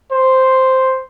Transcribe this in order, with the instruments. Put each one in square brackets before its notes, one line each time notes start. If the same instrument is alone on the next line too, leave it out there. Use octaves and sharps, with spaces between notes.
[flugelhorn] C5